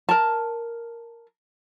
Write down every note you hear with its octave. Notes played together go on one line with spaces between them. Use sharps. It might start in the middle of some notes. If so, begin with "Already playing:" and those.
A#4 A5